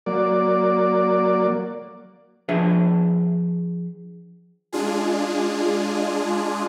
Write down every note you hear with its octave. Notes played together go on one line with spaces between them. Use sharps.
F#3 A#3 D5
F3 D4 G#4 B4 E5
G#3 D4 F4 G#4